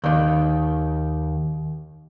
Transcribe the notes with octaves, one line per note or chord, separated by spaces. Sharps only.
D#2 D#3